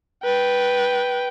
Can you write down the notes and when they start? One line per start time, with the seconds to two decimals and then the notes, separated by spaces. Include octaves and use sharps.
0.24 B4 G5